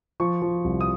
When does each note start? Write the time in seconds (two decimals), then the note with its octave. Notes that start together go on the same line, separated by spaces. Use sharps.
0.20 F3 C#6
0.42 F3
0.64 C2
0.81 D#6